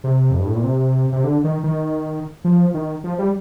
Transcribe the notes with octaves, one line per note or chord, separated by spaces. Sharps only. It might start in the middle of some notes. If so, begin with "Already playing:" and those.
C3
F2
G2
A2
A#2
C3
C3
D3
D#3
D#3
F3
D#3
F3
G3